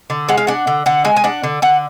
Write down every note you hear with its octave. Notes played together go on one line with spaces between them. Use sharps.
D3
G#3 F#5
F5
D4 F#5
D3
D3 F#5
G#3 G#5
G#5
D4 F#5
D3
D3 F#5